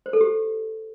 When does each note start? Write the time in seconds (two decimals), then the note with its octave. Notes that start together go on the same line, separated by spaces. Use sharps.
0.06 C5
0.13 A4
0.21 G4